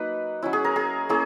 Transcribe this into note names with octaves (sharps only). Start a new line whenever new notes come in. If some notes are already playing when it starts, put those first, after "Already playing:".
Already playing: F#3 A#3 D#4 B4
F#3 C#4 E4
G#4
A#4
G#4
A#3 C#4 E4 G#4